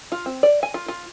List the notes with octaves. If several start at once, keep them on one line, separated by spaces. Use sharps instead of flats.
F4
C4
D5
G#5
F4
F4